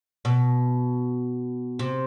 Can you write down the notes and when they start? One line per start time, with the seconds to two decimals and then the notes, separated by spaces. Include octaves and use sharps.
0.25 B2
1.79 C3